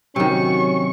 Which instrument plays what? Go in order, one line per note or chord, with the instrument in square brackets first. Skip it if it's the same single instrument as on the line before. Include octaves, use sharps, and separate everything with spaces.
[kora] C3 D#3 [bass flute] F#3 [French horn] C#4 [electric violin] C#6